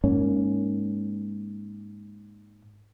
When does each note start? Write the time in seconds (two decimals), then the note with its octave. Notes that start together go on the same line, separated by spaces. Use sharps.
0.04 G#2 A#3 C#4